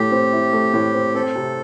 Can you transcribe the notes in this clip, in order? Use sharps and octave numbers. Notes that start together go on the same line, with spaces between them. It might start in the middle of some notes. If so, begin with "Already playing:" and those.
Already playing: A2 A3 G4
C4
E4
A3
A2
C4
C4 A4
C3